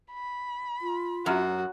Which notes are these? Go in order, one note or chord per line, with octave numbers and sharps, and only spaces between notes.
B5
F4
F#2 F#4